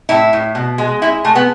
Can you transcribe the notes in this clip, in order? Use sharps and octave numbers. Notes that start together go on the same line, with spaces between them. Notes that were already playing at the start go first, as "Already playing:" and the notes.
A2 E4
A2
B2
G#3
G#3 E4
G#3 A3
B3